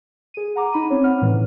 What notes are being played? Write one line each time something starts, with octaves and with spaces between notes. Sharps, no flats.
G#4 D#7
F#5 A#5 D6
D#4 B5 D#7
C4 C#4 C#5
F#5 F6
A2 E3 G#3